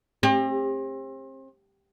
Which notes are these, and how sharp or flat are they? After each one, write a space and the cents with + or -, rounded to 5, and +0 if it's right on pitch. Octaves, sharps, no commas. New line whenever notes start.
C4 +35 G4 +35